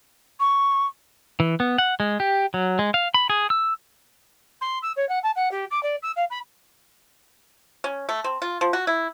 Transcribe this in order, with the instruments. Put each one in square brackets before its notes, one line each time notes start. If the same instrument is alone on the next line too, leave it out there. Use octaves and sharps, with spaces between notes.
[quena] C#6
[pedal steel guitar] E3
B3
F#5
G#3
G4
F#3
G#3
F5
B5
G#4
E6
[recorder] C6
E6
C#5
F#5
A5
F#5
G4
D6
D5
E6
F5
B5
[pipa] C#4
A3
C4
F4
F3
F#4
E4